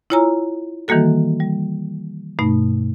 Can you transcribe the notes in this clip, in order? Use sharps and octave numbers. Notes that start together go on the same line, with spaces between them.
E4 F4 C#5 G#5 A#5 E6
D#3 E3 G3 A#3 F#4 A4
G3
G2 B2 A3 D#4